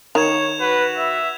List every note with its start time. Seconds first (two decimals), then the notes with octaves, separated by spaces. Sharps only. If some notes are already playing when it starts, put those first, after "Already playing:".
0.15 D#3 C#5 G#6 E7 F7
0.61 F#4 B4
0.97 E5